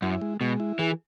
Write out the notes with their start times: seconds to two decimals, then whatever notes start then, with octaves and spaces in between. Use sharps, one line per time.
0.02 F#2 E4
0.21 G#3
0.41 B2 G#3
0.60 E4
0.79 E3 G#4